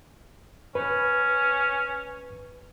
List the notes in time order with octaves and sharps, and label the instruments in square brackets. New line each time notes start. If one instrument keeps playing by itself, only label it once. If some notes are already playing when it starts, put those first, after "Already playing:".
[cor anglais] C#4 [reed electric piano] B4